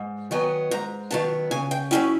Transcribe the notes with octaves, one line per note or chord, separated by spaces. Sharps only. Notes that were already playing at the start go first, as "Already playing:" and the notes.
Already playing: G#2
D#3 F#3 B3 G#5
G#2 A#5
D#3 F#3 B3 A5
C#3 G#5
G5
F#3 A#3 C#4 E4 G5